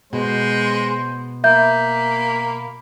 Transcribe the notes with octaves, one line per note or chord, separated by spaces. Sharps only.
B2 G#3 C5
A#3 E5 B5 G6